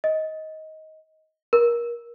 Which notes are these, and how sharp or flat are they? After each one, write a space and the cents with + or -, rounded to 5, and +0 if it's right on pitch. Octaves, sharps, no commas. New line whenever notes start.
D#5 +15
A#4 +25